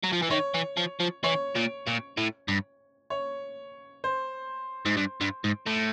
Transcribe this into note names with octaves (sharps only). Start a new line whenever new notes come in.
F#3
F3
E3
D#3 C#5
E3
F3
F3
E3 C#5
A#2
A#2
A2
G2
C#5
C5
G#2
G2
G2
G#2
A2